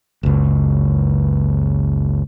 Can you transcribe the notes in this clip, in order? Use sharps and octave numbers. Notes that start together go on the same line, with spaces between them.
F#1 C#2